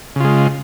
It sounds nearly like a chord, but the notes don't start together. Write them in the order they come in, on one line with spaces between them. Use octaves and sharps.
C#3 F4 G#3